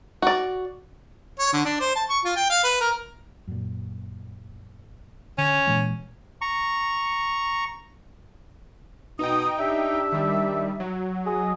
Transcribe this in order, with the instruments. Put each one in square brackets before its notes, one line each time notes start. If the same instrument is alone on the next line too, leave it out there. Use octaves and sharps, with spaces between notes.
[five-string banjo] F#4 D5
[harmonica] C#5
D3
D4
C5
A5
C#6
F4
G5
F5
B4
A#4
[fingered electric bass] F#2 A#2
[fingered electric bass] D3 [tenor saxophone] C#4
[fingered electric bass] A#2 E3 G#3
[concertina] A#5 C#6
[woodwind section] B2 D#6 [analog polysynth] D#4 G5
[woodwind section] D4 G4 E5
[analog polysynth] D#3 G3
F#3
[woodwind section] G#4 D#5